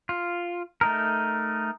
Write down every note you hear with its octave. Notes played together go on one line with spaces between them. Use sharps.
F4
A3 D#4 A#4